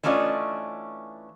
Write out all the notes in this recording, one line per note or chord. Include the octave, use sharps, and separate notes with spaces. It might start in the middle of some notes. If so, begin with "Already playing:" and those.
E3 A3 C#4 D4 F4 D#5